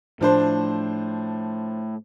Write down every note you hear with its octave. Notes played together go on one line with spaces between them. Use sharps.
A2 F3 D4 C5